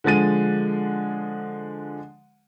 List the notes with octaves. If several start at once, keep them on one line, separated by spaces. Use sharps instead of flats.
D3 F3 G#3 A6 D#7